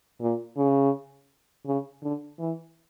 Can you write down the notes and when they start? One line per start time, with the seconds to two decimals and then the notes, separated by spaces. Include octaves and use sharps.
0.21 A#2
0.57 C#3
1.66 C#3
2.02 D3
2.39 E3